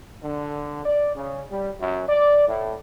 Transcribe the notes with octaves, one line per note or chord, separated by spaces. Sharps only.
D3
D5
C#3
G3
F#2
D5
A2